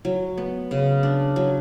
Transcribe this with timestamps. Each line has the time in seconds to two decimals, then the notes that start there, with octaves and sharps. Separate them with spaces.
0.05 F#3
0.38 B3
0.71 C#3
1.03 D4
1.36 F#3